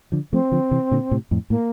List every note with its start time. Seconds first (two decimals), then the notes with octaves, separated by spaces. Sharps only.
0.12 D3 F3
0.32 F3 A3 C4
0.52 D3 F3
0.71 C3 E3
0.91 A#2 D3
1.11 A2 C3
1.31 F2 A2
1.50 A2 A#3